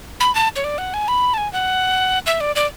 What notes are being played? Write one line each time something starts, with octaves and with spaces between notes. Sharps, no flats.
B5
A5
C#5
D5
F#5
G#5
B5
A5
G#5
F#5
E5
D5
D5